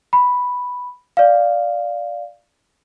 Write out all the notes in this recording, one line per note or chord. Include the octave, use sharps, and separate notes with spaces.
B5
D5 F5